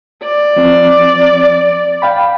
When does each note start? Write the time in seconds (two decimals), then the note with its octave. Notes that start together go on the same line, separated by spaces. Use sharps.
0.24 D5
0.56 F3 C4
2.02 F5 G5 B5